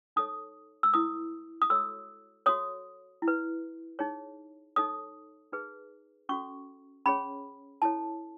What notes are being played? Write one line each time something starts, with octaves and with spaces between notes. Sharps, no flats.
D#4 A4 C#5 D#6
E6
E4 B4 D#6
D#6
F#4 A4 C#5 E6
F#4 A4 C#5 D#6
E4
B4
D#4 G#4 C#5
D#4 A4 C#5 D#6
D#4 G#4 B4
C#4 F#4 A4 C#6
C#4 G#4 C#5 B5
E4 A4 C#5 A5